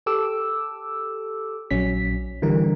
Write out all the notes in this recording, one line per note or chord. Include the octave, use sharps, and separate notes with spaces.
G4 A4 D6 E6
A#1 F#3 C#4 B6
D3 E3 G3 A#4